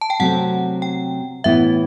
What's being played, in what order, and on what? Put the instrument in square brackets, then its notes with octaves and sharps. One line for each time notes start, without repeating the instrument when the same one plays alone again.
[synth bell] A5
G5
[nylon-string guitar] C3 F#3 A3 C4 [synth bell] F#5
[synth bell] G5
[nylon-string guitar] A2 E3 B3 [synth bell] E5